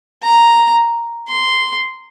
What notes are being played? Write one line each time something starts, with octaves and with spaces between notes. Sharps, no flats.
A#5
C6